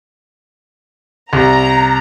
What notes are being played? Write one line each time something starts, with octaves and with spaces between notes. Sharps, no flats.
C2 A#5